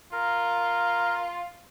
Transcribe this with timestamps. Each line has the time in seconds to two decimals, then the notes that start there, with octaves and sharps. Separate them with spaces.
0.12 F4 A#4